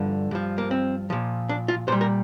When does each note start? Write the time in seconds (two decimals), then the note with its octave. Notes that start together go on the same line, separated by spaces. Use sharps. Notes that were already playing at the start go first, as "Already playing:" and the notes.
Already playing: G2 D3 F3
0.31 G2 F3
0.58 A#3
0.71 C4
1.10 A#2 F3
1.49 D4
1.68 F4
1.88 A#2 G3 C5
2.01 A#4